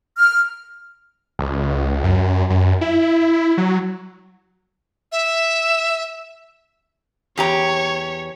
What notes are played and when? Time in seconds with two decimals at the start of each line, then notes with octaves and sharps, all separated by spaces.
0.18 F6
1.39 C#2
2.04 F#2
2.50 F#2
2.81 E4
3.58 F#3
5.12 E5
7.38 E2 G4 C#5 A#5